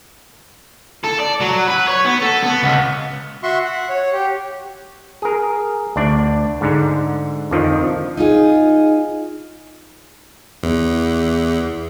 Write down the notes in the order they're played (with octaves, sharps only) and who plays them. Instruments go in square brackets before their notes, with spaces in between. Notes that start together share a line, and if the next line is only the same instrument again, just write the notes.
[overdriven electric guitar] A4
D5
F#3
B4
C#5
B3
A4
B3
C#2
[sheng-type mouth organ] F#4 E5 C6 C#6
F#5
C#5
G4
[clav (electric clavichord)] G#4 A#4
D2 D4 D5
G#2 D3
F2 D3 D#3 F3
[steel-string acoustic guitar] D#4 F4 G#4
[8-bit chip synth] E2